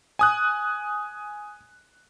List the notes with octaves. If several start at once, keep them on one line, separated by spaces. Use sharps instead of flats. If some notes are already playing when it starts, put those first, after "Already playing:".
G#5 D#6 F#6